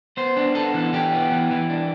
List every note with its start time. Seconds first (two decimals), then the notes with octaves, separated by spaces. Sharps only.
0.17 B3 C5
0.37 D4
0.55 B3 A4
0.74 E3
0.93 E3 G4
1.13 B3
1.31 E3
1.51 E3
1.70 D4